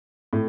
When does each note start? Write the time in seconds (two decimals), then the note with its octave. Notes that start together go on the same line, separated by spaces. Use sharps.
0.33 A2